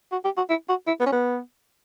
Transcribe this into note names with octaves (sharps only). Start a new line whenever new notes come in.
F#4
G4
F#4
E4
F#4
E4
B3
C#4
B3